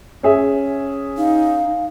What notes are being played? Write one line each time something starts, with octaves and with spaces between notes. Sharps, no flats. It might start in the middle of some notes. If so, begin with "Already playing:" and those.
C#4 G#4 E5
D#4 F5